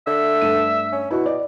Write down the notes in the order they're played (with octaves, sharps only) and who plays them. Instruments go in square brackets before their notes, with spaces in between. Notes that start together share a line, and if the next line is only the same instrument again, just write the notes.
[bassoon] D3 [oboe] E5
[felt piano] G2 A3 D#7
[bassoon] C#4
[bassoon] B2 [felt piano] E4 F#4
[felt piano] D5 D#5